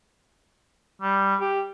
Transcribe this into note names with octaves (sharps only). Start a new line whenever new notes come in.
G3
G4